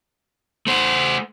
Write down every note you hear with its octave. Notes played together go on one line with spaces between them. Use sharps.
A3 C5